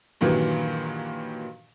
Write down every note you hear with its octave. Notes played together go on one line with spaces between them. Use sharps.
G2 A#2 D#3 E3 F#3